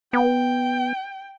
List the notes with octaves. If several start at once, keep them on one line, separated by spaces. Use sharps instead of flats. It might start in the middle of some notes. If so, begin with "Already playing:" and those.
B3 G5